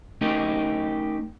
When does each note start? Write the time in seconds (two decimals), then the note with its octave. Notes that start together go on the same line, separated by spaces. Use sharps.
0.21 A3 C#4 D#4 G4 A#4 D#5